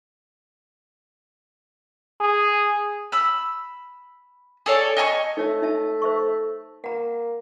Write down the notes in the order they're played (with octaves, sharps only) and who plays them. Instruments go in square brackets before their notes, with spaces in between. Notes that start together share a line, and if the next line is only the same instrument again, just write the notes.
[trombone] G#4
[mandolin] B5 E6
G#4 A4 C#5 D5
D#5 G#5 A5 C#6
[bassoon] A3 [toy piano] D#4 C#5 E5
[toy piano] D#4 E5 A5
C5 E5 C#6
[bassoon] A#3 [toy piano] F#5 A#5